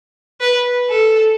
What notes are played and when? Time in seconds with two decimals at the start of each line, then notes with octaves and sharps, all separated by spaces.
0.40 B4
0.90 A4